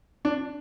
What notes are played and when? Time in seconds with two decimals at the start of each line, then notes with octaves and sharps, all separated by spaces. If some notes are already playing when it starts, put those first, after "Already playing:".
0.25 D4